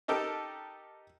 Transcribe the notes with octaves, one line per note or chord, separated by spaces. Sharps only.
D#4 G4 A4 A#4 G5